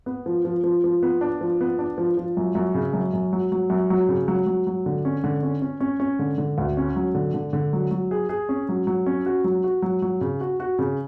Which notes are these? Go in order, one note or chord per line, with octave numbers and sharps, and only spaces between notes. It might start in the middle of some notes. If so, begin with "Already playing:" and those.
B3
F3
F3
F3
F3
B3
D4
F3
B3
D4
F3
F3
F#2
F#2
C#3
F#2
F#2
F#3
F#3
F#2
F#3
C#3
F#3
F#3
F#3
D3
C#4
D3
C#4
C#4
C#4
C#4
D3
D3
D2
C#4
F#3
D3
D3
D3
F#3
F#3
G#4
G#4
C#4
F#3
F#3
C#4
F#4
F#3
F#4
F#3
F#3
C#3
F#4
F#4
C#3